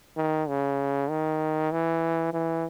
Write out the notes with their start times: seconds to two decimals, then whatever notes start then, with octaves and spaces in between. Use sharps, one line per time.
0.17 D#3
0.48 C#3
1.09 D#3
1.72 E3
2.33 E3